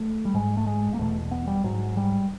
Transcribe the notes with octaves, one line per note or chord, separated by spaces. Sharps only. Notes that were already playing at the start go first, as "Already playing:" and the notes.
Already playing: A3
G3
G#2 G#3
A3
G#3
A#3
E2 B2 A3
B3
G3
G#2 F#3
G3